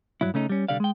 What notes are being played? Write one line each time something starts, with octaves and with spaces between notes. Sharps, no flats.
G2 F#3 E4
C#3 A3 C#4 D#4
G3 C#4
C2 D3 G3 D5 F5
G#3 G5